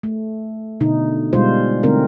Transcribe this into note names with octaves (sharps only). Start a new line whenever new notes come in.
A3
B2 D3 D#4
B2 G3 G#3 F4 C5
D3 A3 C4 D#4 A#4